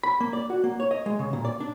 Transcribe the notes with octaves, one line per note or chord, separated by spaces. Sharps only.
B5
A#3
D5
F#4
A#3
C#5
D#5
G#3
C#3
A#2
D5
D4